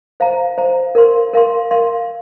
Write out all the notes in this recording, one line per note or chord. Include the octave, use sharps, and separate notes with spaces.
C5 F5 A#5
C5 F5 A#5
A#4 F5 C6
A#4 F5 C6
A#4 F5 C6